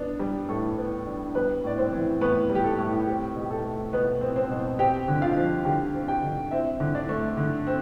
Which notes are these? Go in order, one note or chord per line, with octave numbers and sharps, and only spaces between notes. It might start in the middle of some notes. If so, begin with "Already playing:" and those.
Already playing: B3 D4
G3
A2 A4
B3
D4
G3 B3 B4
A2 D5
C4 C5
E3
A2 B3 B4
G3
G4
A4
A2
C4 G4
B2
G4
A4
A3
B2 B3 B4
C4
C4 C5
B2
C4 G4 G5
D3
F4 F5
F3
D3 G4 G5
C4
G4 G5
D3
C4 E4 E5
D3
D4 D5
A3
D3
C4